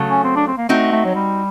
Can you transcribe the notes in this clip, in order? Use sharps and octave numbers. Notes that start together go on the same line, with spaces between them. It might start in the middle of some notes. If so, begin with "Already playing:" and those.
Already playing: C#3 F#3 A3
C#4
C4
D4
C4
A#3
A3 C4 D#4 F#4
A3
F#3
G3